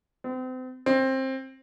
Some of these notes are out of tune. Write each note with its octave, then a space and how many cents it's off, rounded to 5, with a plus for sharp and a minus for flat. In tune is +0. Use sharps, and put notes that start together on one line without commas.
C4 -35
C4 +20